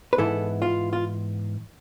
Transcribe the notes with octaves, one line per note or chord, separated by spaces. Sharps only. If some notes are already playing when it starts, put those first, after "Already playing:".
B4
G#2 E3 B3 E4 A4
F4
F4